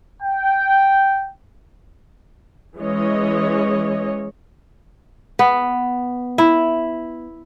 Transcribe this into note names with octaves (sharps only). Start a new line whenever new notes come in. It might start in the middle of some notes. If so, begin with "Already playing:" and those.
G5
E3 G#3 C#4 C#5 D#5
B3
E4